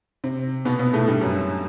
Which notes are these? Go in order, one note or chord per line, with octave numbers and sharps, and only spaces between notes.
C3 C4
B2 B3
B2 B3
A2 A3
G2 G3
F#2 F#3